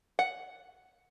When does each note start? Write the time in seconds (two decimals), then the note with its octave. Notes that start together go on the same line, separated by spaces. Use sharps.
0.19 F#5